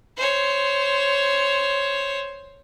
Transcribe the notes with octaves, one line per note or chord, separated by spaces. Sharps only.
C5 C#5